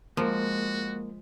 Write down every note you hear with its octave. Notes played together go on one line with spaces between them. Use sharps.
F3 G#3 A#3 F#4 A#4